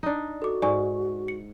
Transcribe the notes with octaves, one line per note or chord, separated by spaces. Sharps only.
D4 D#4
F#4 A4 D6
G#2 D5 G#5 C#6
C#7